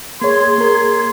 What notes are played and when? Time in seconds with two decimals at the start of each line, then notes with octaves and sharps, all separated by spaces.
0.22 A#3 G#4 C#5 C6 G#6
0.58 A#3 A#4